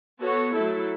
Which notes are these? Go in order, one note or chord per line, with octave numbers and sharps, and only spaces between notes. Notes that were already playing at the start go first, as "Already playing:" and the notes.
B3 F#4 A4 C#5
F#3 A3 E4 A4